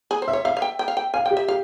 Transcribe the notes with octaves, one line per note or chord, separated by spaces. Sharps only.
G#4
C5
E5
C#5
E5 F5
F5
G5
G5
F5
G5
F5 G#5
G5
G4
E5
G4 F5